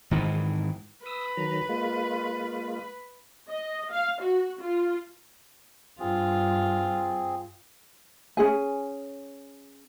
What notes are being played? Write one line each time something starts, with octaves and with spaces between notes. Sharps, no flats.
G#2 D#3 E3
B4 D#6 E6
D#3 F#3 A#5
G#3 A#3 F4
D#5
F5
F#4
F4
G2 C4 F4 G#4
C#4 D#4 G#4 G#5